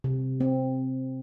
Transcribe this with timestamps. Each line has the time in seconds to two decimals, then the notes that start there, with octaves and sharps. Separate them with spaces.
0.04 C3
0.40 C4